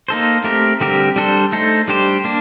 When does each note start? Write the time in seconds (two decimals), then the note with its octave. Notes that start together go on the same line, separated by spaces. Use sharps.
0.08 A#3 D#4 A4 C5
0.44 A3 C4 G4 A#4
0.81 D3 G3 C4 G4 A#4
1.16 G3 D4 A4 C5
1.52 A3 D#4 A4 C5
1.88 G3 D4 G4 C5
2.24 A#3 D4